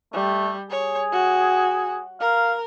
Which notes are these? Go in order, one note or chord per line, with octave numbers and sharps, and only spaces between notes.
G3 A3
G#4 C#5
F#4
A#4 F5